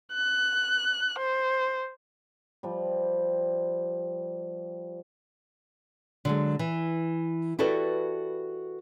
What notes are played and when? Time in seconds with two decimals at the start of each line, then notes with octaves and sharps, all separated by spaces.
0.14 F#6
1.18 C5
2.63 F3 G3
6.25 D3 F#3 G#3
6.59 E3
7.59 E4 F#4 G4 A4 B4 D5